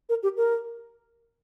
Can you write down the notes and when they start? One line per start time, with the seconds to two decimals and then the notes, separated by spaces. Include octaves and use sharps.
0.09 A#4
0.23 G4
0.37 A#4